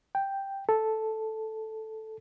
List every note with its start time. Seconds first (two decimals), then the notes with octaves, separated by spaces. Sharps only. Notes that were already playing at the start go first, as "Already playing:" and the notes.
0.15 G5
0.69 A4